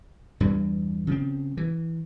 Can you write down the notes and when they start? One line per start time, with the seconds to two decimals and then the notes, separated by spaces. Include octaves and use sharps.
0.40 E2 G2 E3 G3
1.07 C#3 F3 C4
1.57 E3